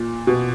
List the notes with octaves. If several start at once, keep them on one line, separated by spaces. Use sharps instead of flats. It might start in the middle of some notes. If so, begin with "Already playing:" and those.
Already playing: A#2
B2